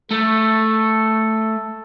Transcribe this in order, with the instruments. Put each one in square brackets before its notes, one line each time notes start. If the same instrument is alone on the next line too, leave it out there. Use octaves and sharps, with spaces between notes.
[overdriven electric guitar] A3 [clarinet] A4